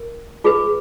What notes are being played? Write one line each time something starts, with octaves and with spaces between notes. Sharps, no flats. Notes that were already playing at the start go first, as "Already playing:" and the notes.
Already playing: A#4
F4 G#4 B4